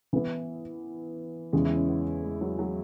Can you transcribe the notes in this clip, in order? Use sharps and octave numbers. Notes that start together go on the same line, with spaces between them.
E3 B3 E4
E2 C#3 E3 G#3
E4
C#4
B3
G#3
F#3
F#3